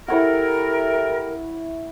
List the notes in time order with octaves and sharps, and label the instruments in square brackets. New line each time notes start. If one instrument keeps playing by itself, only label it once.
[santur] E4 C#5 F#5 [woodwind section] G4 A4 A#4